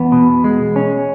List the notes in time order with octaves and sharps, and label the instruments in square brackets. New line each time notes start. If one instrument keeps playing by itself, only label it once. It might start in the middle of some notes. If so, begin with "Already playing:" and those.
Already playing: [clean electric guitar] E2 B3
B2
G#3
C#4